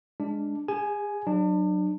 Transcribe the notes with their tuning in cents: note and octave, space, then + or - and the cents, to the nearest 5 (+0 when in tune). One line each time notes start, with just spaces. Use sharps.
G#3 +0 D4 +0
G#4 -40 G#5 +10
F#3 +0 D4 +35